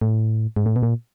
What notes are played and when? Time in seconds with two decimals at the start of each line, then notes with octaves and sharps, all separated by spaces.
0.02 A2
0.56 G#2
0.66 A2
0.76 B2
0.83 A#2